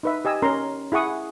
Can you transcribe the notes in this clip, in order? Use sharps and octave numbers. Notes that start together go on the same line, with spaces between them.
D#4 B4 E5
G4 D#5 G#5 E6
C#4 A#4 A#5 C6
E4 G#4 F#5 C#6 D#6